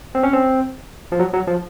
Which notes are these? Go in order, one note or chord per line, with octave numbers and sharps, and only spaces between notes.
C4
C#4
C4
F3
F#3
F#3
F3